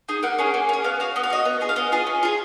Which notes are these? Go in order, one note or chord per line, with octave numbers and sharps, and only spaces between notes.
D#4 G#4
A#3 F#5
C#4 G#4
A#3
C#4 G#4
B3 F5
F#4 F5
B3 D#5
F5
F#4 D#5
B3
F4 G#4
F5
B3 D#5
F4 G#4
C#4
F4 G#4